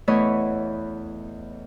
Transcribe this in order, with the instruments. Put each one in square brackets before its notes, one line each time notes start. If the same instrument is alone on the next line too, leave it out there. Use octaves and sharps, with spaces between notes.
[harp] E2 E3 A3 B3 C#5 D#5